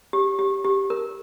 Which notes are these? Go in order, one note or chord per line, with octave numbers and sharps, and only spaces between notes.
G4
G4
G4
A#4